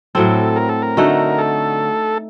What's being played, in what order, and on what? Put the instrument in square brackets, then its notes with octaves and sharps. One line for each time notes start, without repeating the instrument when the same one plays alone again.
[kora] A2 F#3 C4 [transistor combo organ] A4
[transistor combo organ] A#4
A4
A#4
[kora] D3 A3 D#4 F#4
[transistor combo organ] A4